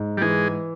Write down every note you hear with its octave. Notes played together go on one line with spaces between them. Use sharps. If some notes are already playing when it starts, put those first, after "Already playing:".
Already playing: G#2
G3
E3 G#3